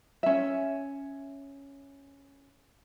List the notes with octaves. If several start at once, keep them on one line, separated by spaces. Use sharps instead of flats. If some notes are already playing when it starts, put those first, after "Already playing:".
C#4 E5